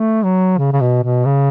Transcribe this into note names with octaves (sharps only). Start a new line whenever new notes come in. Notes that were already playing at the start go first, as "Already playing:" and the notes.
Already playing: A3
F#3
C#3
C#3
B2
B2
C#3